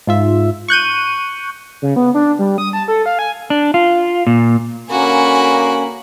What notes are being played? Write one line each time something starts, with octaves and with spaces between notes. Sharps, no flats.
G#2 F4 E5
C#6 F#6 G6 D#7
C#3
B3
D4
G3
D#6
A5
A4
F5
G#5
D4
F4
A#2
D3 A#3 C#4 F#4 G#5 B5